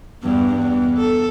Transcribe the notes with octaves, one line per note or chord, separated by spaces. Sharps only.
E2 G2
E2
A4